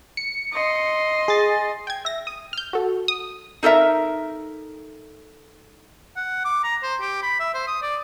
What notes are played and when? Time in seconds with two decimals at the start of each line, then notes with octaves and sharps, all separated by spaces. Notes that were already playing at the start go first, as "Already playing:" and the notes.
0.17 C#7
0.52 D#5 C6
1.28 G#4 A6
1.87 G5 G#6
2.05 E5 A#6
2.27 D#6
2.53 F6 G6
2.73 F#4 A4
3.08 D#6
3.63 D#4 A4 A#4 E5
6.16 F#5
6.45 D6
6.64 A#5
6.83 C5
7.01 G4
7.23 B5
7.40 E5
7.54 C5
7.68 D#6
7.82 D5